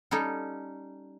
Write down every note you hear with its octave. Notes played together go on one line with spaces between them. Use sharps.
G3 C#4 D#4 A4